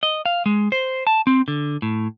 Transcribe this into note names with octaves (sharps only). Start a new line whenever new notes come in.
D#5
F5
G#3
C5
A5
C4
D3
A2